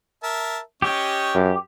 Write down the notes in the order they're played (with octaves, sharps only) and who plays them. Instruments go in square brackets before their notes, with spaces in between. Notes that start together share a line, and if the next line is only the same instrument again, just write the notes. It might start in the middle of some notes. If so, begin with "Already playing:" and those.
[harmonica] A#4 E5 A5
[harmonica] C#4 D#5 C#6 [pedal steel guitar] G4
[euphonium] F#2